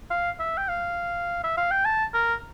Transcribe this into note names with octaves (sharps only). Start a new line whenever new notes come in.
F5
E5
G5
F5
E5
F5
G5
A5
A#4